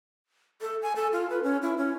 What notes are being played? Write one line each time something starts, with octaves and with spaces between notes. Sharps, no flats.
A4
G#5
A4
F4
B4
C#4
E4
C#4